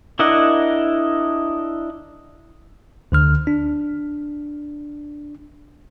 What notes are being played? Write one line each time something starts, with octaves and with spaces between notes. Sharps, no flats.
D4 E4 A#4 D#5 F#5
D2 D3 F6
D4